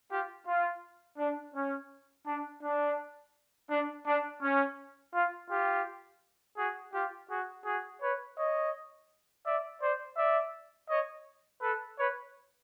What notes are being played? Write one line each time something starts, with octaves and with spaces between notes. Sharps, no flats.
F4 G4
F4
D4
C#4
D4
D4
D4
D4
C#4
F4
F4 G4
F#4 G#4
F4 G4
F#4 G#4
F#4 G#4
B4 C#5
C#5 D#5
D5 E5
C5 D5
D5 E5
C#5 D#5
A4 B4
B4 C#5